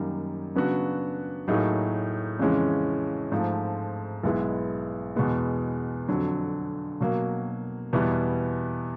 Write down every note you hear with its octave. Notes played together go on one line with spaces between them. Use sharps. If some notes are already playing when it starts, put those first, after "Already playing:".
Already playing: F#2 D#3 G3 A#3
C#3 F#3 B3 D4 F#4
A2 F#3 A#3 D#4 G#4
F2 C#3 E3 G#3 C#4
G#2 F3 A3
B1 B2 G#3 B3 E4
E2 B2 G#3 B3
F2 D3 F#3
B2 F#3 A#3
E2 B2 G3 B3 E4